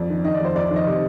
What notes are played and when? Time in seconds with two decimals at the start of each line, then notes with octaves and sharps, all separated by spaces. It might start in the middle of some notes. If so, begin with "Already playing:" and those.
Already playing: F2 D5
0.10 D#3
0.24 D#3 D#5
0.34 D5
0.40 F2 C5
0.55 F2 D5
0.65 D5
0.71 D#3
0.76 D#5
0.87 C3